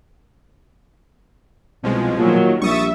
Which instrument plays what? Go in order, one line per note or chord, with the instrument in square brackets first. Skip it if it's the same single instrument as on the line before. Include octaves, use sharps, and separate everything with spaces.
[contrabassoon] C2 [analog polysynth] B2 F3 G#3
[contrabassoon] A#2 [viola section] D#3 F#3
[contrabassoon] A#1 [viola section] G3 E5 [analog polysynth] C#6 D#6 A6